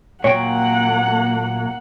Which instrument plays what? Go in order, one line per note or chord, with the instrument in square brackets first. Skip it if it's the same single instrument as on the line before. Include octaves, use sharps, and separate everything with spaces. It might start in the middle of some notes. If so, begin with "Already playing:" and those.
[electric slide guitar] A#2 F#3 G5 [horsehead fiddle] A#3 F#5 [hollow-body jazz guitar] C#5